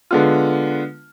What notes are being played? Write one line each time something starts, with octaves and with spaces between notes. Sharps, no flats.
D3 G#3 B3 F4